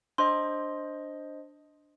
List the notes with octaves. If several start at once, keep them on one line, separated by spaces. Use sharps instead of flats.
D4 C5 D#5 C6